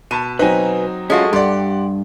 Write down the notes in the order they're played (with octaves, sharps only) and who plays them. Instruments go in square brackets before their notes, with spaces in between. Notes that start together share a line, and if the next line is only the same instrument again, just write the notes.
[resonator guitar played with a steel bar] B2 [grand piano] A5 B5 D#7
[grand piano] F#3 C4 D#4 [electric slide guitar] B4 G#5
[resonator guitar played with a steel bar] G#3 A3 F#4 [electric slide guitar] C#4 F4
[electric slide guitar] G2 [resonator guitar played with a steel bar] G4 [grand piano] D5 F#5 C6